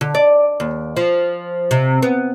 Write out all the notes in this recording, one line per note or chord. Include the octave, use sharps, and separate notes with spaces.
D3
D5
D#2
F3
C3
B3